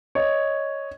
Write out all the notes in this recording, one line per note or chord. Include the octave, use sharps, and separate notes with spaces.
C#5 D#5